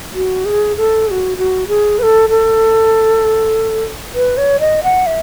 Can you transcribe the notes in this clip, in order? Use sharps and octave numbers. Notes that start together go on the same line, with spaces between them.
F#4
G#4
A4
G#4
F#4
F#4
G#4
B4
A4
A4
B4
C#5
D#5
F#5
E5